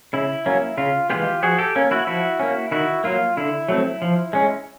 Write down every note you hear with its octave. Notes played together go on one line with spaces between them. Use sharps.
C#3 E4
F#3 A#3 C#4
C#3 F4
E3 G#3 B3 F4 G4
F3 F#4 G#4
G4 A4
A#3 C#4
E4 F#4
F3 E4 F#4
A#3 C#4
D#3 E4 F#4
F#3 A#3 F4
D3 E4
F#3 A3 C4
F3
G#3 C#4